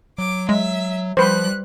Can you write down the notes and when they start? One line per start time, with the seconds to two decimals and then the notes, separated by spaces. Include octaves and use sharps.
0.18 F#3 D6
0.49 G#3 E5
1.17 F3 G3 B4 C5 F#6